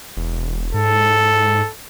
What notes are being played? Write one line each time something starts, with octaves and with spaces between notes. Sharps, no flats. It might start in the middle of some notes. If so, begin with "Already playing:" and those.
E1
G#2 A4